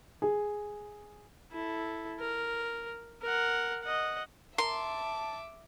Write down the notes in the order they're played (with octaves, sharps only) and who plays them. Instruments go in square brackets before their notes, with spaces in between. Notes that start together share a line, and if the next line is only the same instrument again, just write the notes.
[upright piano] G#4
[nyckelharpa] E4 A4
A#4
A#4 F#5
D#5 F#5
[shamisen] A#4 [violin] E5 D6 [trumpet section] A5 [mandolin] C6